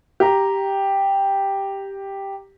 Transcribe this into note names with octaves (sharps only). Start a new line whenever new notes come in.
G4 A#5